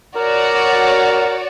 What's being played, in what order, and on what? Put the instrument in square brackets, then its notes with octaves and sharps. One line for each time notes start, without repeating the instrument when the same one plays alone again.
[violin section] F#4 C#5 D5 [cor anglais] A#4